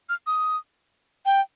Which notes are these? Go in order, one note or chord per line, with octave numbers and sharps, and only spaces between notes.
F6
D#6
G5